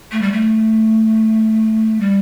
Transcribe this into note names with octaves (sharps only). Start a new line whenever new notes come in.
A3
G3
A3
G3